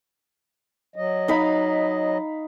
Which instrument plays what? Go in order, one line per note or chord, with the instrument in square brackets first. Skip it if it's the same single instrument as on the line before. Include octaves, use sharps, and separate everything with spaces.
[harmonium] F#3 D#5
[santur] D#4 F5 B5